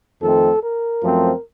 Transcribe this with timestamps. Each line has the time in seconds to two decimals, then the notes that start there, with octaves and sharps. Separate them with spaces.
0.21 F2 D#3 A3 C4 A4
0.62 A#4
1.02 F#2 F3 A3 C4